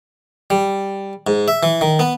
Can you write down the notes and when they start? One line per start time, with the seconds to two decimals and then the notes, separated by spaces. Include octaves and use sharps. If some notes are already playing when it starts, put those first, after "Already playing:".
0.50 G3
1.27 G#2
1.48 E5
1.63 E3
1.81 D#3
1.99 B3